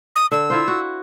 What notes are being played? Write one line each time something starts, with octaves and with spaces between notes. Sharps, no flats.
D#6
D3 E6
E4 F4 C5
F#4